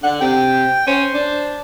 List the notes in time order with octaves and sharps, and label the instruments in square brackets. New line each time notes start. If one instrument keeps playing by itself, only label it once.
[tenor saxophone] D3 [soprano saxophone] F#5
[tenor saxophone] C3 [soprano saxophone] G5
[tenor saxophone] C#4 [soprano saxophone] C5
[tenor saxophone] D4